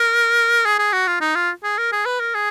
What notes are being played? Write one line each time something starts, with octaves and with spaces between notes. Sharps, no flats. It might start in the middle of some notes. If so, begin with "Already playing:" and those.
Already playing: A#4
G#4
G#4
F#4
F4
D#4
F4
G#4
A#4
G#4
B4
A#4
G#4